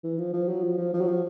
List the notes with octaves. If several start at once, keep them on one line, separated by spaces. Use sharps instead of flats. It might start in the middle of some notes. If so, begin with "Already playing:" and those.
E3
F3
F3
F#3
F3
F3
F3
F#3
F3